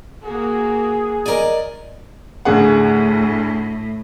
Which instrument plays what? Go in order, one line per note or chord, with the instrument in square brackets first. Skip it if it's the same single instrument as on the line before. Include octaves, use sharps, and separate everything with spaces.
[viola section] A#3 F#4 [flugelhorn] G#4
[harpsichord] A#4 G#5 [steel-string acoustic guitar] D5 D#5
[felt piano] D2 G#4 F#5 [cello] A2